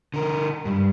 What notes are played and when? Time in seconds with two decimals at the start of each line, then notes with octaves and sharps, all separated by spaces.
0.14 D3 A#4
0.65 G2